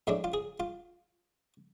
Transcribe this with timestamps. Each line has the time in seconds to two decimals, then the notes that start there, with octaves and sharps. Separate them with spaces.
0.07 A2 G#3 D4 E5
0.24 F4
0.34 G#4
0.60 F4